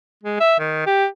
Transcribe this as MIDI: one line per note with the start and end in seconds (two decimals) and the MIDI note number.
0.24 0.38 56
0.40 0.56 76
0.60 0.86 51
0.86 1.06 67